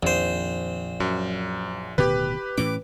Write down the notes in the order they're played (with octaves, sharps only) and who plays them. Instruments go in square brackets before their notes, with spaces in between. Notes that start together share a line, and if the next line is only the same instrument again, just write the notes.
[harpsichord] A#1 C5 [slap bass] F2 A#2 D#3
[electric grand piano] F#2 [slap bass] F#3
[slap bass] D1 B2 D#3 [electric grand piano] G4 B4
[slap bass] A2 E3 C#4 [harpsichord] D6